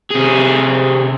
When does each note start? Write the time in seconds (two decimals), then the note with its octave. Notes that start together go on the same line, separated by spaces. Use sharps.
0.10 C3 G#4